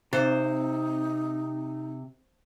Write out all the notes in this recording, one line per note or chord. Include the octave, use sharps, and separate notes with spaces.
C3 C4 D#4 C5